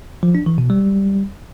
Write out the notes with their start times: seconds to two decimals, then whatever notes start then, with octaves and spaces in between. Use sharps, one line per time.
0.23 F3
0.35 D4
0.46 E3
0.58 B2
0.70 G3